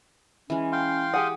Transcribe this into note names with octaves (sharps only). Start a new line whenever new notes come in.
E3 G#3 C#4
F5 G5 C6
G4 G#4 F#5 D#6